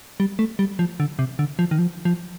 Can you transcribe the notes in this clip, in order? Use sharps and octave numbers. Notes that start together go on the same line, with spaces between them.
G3
A3
G3
F3
D3
C3
D3
F3
D#3
F3
F3